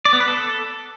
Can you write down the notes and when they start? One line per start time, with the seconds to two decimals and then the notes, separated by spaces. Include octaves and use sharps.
0.05 D5
0.13 B3
0.20 B4
0.28 A4